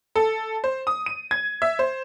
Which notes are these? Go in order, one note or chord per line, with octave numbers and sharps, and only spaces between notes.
A4
C5
D#6
D#7
G#6
E5
C5